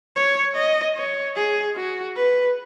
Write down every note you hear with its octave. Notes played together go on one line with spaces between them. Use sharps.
C#5
D#5
C#5
G#4
F#4
B4